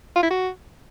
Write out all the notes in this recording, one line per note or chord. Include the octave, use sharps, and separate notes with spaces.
F4
E4
F#4